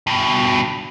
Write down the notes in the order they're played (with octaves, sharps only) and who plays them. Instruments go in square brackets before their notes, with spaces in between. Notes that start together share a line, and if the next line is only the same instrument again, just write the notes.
[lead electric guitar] G2 B2